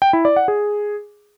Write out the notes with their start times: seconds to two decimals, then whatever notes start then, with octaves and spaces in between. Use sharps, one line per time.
0.02 G5
0.13 E4
0.25 D5
0.36 F#5
0.48 G#4